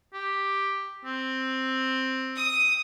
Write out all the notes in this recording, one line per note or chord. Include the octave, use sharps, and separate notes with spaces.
G4
C4
D#6